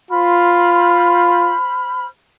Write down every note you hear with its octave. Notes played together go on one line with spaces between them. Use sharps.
F4 C5 B5 F6